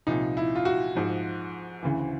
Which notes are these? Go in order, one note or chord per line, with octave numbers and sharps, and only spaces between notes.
C2 A#2 F3 D#4
E4
F4
F#4
G#2 F3
D2 C#3 E3